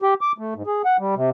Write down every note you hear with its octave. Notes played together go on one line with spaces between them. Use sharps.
G4
D6
A3
G#2
G#4
F#5
G3
C3